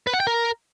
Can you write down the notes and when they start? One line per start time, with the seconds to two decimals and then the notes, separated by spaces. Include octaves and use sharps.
0.07 B4
0.13 F#5
0.20 G5
0.27 A#4